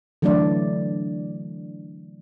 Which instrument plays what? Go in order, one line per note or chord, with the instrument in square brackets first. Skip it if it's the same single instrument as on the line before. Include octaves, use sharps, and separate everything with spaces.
[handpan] D3 E3 F#3 A3 D4 D5